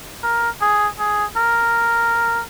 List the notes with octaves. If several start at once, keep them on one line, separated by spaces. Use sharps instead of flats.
A#4
G#4
G#4
A#4